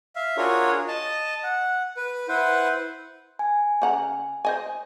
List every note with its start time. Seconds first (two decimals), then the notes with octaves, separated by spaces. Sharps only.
0.16 E5 F5
0.37 D4 F4 F#4 G#4 A#4 C#5
0.88 D#5 A5
1.44 F#5
1.97 B4
2.28 E4 B4 C5 F#5
3.39 G#5
3.82 C#3 F#5 A#5
4.45 C5 D#5 G#5